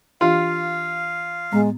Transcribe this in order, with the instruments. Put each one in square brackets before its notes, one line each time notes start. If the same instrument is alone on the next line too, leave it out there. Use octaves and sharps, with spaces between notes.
[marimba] E3 D4 G4 [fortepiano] F4 [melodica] F5
[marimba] A2 B3 [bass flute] G#3